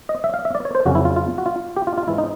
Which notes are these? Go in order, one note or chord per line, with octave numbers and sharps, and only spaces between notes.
D#5
E5
F5
E5
D5
C#5
C5
F2 C#3 F#3 A#3 C#4 F#4
E4
F4
F4
F#4
F4
G4
F4
F4
G#2 E3 G#3 E4
D#4